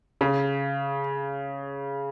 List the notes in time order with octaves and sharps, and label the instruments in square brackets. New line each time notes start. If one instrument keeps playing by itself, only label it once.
[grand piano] C#3